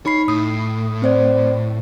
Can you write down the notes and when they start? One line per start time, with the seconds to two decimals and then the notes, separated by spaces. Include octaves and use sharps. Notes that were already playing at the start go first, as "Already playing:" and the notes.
0.06 D#4 C#5 B5 C7
0.28 A2 D#6
1.02 C4 C5 D5